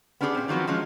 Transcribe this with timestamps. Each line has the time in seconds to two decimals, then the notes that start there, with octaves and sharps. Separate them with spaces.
0.21 B3 C#4 D4 G4 G#4
0.35 A#2 C4
0.48 D#3 F3 F#3 B3 C4
0.67 F3 F#3 G#3 C#4